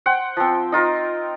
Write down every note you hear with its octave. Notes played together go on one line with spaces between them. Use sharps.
C5 F#5 G5
F3 C4
D#4 F4 A#4